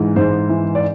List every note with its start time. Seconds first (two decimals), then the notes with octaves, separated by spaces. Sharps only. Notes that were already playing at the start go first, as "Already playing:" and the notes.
Already playing: G#2 E3
0.16 G#2 C5
0.49 E3
0.75 D5